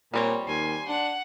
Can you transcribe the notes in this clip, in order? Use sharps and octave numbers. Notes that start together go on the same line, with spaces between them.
A#2 G3 C4 C#5
D#2 G#5 C6
D4 F#5